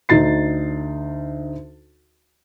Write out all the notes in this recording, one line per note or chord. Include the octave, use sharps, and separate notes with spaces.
D2 D3 D#4 A6 C7